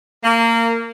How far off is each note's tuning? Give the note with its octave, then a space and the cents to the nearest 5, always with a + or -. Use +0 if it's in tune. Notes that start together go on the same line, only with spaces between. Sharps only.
A#3 -20